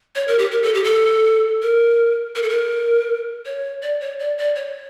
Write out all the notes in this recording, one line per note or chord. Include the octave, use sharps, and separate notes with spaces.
C#5
A#4
G4
A#4
A4
G4
A4
A#4
A#4
A4
A#4
C#5
D5
C#5
D5
D5
C#5